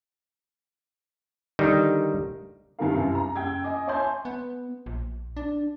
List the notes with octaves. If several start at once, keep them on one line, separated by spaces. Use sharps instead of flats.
D3 D#3 G3 D#4
G2 C3 D#3 G3 A#4 F5
C2 F#2
A#5
F#1 G5 E6 G#6
D#5 G#5 D6
C#5 E5 G#5 A5 C6 G6
B3
A#1
D4